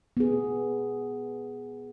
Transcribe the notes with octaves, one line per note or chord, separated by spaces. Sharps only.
B3 G#4